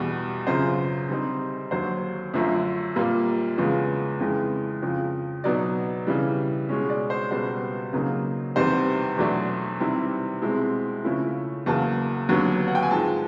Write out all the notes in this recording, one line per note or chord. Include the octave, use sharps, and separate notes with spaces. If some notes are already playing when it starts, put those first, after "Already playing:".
Already playing: E2 B2 G3
F#2 C#3 F3 C5
D3 G3 C4 D#4
D#2 D3 F#3 C5
F#2 D3 F3 A3
A#2 G3 A#3
E2 C#3 F3 G#3 B3
F2 C#3 E3 G#3
F2 C#3 F3
B2 F#3 B3 D#4 D5
C#3 E3 G3
B2 G#3 C#4
D5
C5
C#2 B2 G3 B3 C5
C#3 F#3 A#3 D#4
E2 C3 D#3 G3 B3 C5
E2 B2 F#3 A3 D4
C3 D#3 G3 C4 E4
C2 B2 G#3 C4 E4
C#3 F3 A3 C#4 E4
E2 C#3 F#3 A#3 A5
D#2 D3 F#3 B3
F#5
G5
G#5
G#2 F3 G#3 A5